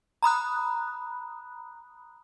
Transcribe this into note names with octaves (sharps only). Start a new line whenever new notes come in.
A#5 B5 D#6 F#6